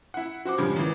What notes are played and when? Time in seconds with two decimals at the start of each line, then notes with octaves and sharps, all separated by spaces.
0.14 E4 F#5
0.45 F#4 C5 F#5 D6
0.58 G2 C#3 F3 G3 G#3
0.76 G#1 E3